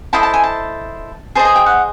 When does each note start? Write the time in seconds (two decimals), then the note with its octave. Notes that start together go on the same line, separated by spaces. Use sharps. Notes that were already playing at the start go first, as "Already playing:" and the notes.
0.13 E4 A4 C5 D#5 A5
0.23 A5
0.34 G#5
0.44 A5
1.35 G#4 C5 D#5 A5
1.45 G#5
1.56 G5
1.66 F#5